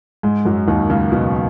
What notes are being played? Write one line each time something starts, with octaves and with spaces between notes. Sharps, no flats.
G#2 G#3
F#2 F#3
D#2 D#3
C#2 C#3
B2